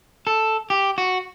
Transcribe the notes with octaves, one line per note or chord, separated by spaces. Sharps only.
A4
G4
F#4